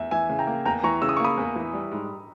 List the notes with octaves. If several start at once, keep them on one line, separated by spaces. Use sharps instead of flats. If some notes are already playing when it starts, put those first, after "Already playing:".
Already playing: E2 E5
E3 E5 G#5
C#3
G5 A#5
A#3
E2 G5 A#5
E3 A#5 C#6
C#3 E6
D#6
C#6
A#3 B5 D#6
E2
E3
G3
G#2